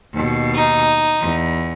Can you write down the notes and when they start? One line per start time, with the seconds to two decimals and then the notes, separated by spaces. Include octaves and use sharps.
0.13 D#2 B2
0.55 D#4
1.20 E2